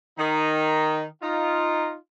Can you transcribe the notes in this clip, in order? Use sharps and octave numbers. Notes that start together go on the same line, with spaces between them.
D#3 D#4
D#4 F4